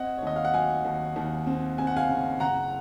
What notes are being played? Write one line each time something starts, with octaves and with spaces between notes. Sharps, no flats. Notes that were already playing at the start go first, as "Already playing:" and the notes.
Already playing: C4 D#5 F#5
C#5
D#2 D#5
F5
F#5
F#3 F5 G#5
D#2
D#2
C4
C4 G#5
F#5
F5 G#5
C#3
F#1 F#5 A#5